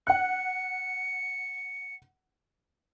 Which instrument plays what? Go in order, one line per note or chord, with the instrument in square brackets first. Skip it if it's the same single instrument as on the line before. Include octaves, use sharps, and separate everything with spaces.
[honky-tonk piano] F#5 F#6 [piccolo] C#7